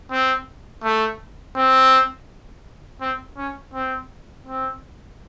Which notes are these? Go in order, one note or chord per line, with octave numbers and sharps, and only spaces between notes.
C4
A3
C4
C4
C#4
C4
C4